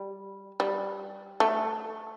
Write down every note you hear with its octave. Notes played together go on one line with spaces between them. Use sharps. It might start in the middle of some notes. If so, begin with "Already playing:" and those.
Already playing: G3
G3
A3